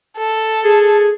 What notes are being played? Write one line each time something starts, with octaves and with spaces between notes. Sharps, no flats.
A4
G#4